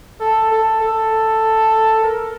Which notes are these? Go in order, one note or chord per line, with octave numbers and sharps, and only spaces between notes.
A4
A4
A4
A#4